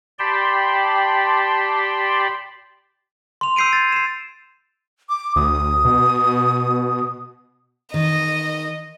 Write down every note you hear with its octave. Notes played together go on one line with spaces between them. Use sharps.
G4 D5 G5 A5 B5 C6
C6 F7
E6 G6 C7 D7 D#7
G#6 A6
C7 E7
D6
D2 D#6
B2
D#3 D#5